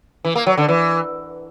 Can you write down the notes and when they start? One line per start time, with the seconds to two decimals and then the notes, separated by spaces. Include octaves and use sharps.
0.25 E3
0.36 A#3
0.47 F#3
0.58 D3
0.68 E3